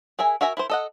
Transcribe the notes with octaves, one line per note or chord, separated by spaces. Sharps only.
G#4 A#4 E5 G#5
F#4 A#4 E5 G#5 A#5
E4 A#4 C5
A4 D#5 F#5